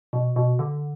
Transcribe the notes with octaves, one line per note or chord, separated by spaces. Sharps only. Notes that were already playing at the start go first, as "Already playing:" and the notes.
B2
B2
D3